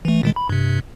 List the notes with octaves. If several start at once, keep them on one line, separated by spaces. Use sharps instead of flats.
E3 A3
A#2 D#3 G#3
B5
G2 C3